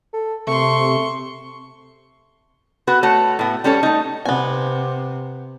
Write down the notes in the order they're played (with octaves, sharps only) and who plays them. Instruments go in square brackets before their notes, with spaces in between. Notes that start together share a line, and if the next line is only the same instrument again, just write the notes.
[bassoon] A4
[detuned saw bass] C3 [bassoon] A3 [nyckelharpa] C6 C#6
[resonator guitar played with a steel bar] B3 F#4 B4
A3 F#4 C#5
A2 B3
G3 C#4 A4 C#5
A3 D#4
[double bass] C3 [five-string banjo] B3 G#5